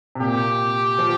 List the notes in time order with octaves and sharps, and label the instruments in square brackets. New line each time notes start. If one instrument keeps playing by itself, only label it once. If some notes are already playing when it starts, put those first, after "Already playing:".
[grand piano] C3
[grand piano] A#2 [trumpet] G4
[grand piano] F3